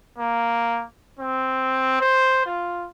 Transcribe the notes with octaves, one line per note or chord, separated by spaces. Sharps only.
A#3
C4
C5
F4